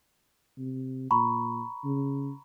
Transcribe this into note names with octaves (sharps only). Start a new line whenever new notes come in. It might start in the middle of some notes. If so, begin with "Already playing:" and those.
C3
A#2 A#5 B5 C#6
C#3